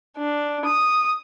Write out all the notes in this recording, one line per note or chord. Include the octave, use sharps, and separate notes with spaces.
D4
D#6